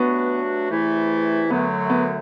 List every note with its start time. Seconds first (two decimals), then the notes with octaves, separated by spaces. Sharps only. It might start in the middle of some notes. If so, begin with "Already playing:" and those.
Already playing: G2 F#3 A3 B3 D4 F#4
0.70 E2 C3 E3 A3 E4
1.50 F#2 D3 F#3 A3 B3
1.90 B3